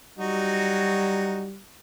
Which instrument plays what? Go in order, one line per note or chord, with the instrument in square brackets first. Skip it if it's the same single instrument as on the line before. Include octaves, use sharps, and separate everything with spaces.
[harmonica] F#3 D#4 F#4 [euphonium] G3